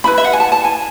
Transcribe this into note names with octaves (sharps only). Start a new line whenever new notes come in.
C#4 E4 B4 B5
E5
F#5
G#5
A5
A5
G#5